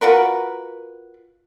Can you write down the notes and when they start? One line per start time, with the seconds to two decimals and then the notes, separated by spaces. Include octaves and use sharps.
0.01 F4 F#4 A#4 B4